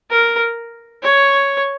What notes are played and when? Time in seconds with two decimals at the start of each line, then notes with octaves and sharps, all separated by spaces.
0.10 A#4
1.03 C#5